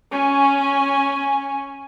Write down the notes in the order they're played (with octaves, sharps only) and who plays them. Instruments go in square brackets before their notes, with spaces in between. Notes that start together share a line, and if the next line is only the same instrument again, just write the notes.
[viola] C#4 G#5